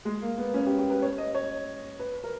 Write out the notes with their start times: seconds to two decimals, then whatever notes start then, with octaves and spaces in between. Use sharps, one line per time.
0.05 G#3
0.22 A#3
0.38 B3
0.54 C#4
0.66 G4
0.79 G4
0.90 B4
1.02 C#5
1.18 D#5
1.35 C#5
2.00 B4
2.24 A#4